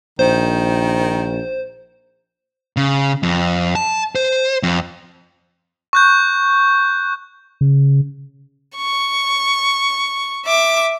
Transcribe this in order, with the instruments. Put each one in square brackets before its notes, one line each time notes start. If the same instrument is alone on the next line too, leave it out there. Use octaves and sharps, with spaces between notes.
[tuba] A#1 [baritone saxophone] D#3 [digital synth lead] C5
[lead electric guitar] C#3
F2
A5
C5
F2
[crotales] C#6 F#6 G6
[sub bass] C#3
[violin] C#6
E5 D6